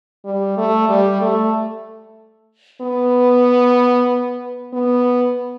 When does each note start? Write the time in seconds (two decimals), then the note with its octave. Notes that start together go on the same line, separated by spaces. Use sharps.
0.25 G3
0.57 A3
0.89 G3
1.21 A3
2.81 B3
4.73 B3